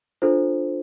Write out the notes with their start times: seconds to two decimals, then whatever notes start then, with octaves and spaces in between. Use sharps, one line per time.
0.22 D4 F4 A4 C5